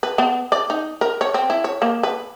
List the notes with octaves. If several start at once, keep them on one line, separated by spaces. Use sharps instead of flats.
B4
B3
D5
D#4
A#4
C#5
C4
E4
C#5
A#3
B4